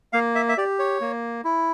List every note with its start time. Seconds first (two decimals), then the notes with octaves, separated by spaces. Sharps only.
0.13 A#3 F5
0.35 E5
0.49 E5
0.57 G4 D5
0.79 C#5
1.01 A#3
1.44 E4